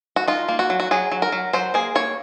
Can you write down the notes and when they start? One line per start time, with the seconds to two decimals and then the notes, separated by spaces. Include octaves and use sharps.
0.16 F#4
0.27 D#4 F4
0.48 A#3
0.59 F#4
0.70 F#3
0.80 F#4
0.91 F#3 G#4
1.12 F#3
1.22 A#4
1.32 F#3
1.53 F#3 C5
1.74 A#3 G#4
1.95 A#3 C#5